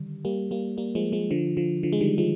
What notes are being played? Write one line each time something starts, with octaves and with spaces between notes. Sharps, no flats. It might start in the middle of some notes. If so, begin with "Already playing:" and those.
Already playing: D3 D#3 G3
G3 A#3
G3 A#3
G3 A#3
F3 G#3
F3 G#3
D3 F3
D3 F3
D3 F3
G#3
D#3 G3
F3 G#3